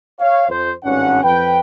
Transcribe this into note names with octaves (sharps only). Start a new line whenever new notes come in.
C#5 F5
F2 C5
G#1 G2 C#4 F#5
F2 B4 G5